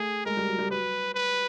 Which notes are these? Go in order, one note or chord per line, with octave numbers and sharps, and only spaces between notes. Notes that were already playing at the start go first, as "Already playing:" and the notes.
Already playing: A3 G#4
G#3 A#4
G3
F#3
G3
F#3 B4
B4